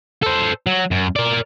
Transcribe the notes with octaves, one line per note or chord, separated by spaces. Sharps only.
A4 C5
F#3
F#2
A#4 D5